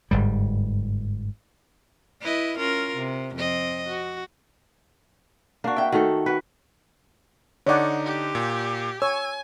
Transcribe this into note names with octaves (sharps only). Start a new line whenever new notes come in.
G1 G#2 G3
E4 B4 D#5
C#4 F4 A#4
C3
F2 C4 D#5
F#4
A#3 D4 F#4
E5 G5
D#3 A3 F#4 A4
F#4 B4
D3 D#4 C#5 D5 F#5
G4
A#2
C#5 G#5 E6